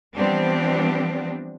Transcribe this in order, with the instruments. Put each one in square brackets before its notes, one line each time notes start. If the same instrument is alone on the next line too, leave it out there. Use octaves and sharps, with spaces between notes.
[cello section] E3 F3 G3 B3 C4 D4